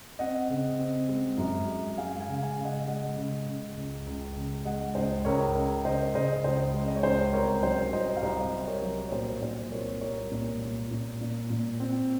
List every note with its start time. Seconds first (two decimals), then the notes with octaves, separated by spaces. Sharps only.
0.19 C4 D#5 F#5
0.50 C#3
0.79 C4
1.09 G#3
1.38 F#2
1.68 G#3
1.97 G#3 F5 G#5
2.20 F5 G#5
2.28 C#3
2.42 F5 G#5
2.57 C#3
2.65 D#5 F#5
2.87 G#3 D#5 F#5
3.17 C#3
3.46 C#3
3.77 C#2
4.07 C#2
4.36 C#3
4.65 G#3 D#5 F#5
4.95 C#2 C5 D#5
5.25 C#2 A#4 C#5
5.55 C#3 A#4
5.85 C#3 C5 D#5
6.14 C#3 C5 D#5
6.44 C#2 C5
6.74 G#3
6.88 D#5
6.96 C#5
7.03 C#2 C5
7.33 C2 A#4 C#5
7.63 F#3 C5
7.93 C2 C5 D#5
8.17 F5
8.22 C2 C5 D#5
8.53 C2
8.67 A#4 C#5
8.82 F#3
9.08 C#5
9.12 A#2 C5
9.42 A#2 C5
9.71 C2 A#4 C#5
10.01 C2 A#4 C#5
10.32 A#2
10.62 A#2
10.91 A#2
11.21 A#2
11.50 A#2
11.80 C4